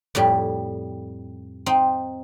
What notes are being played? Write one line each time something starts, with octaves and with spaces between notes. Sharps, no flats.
F2 A2 G3
C4 D#4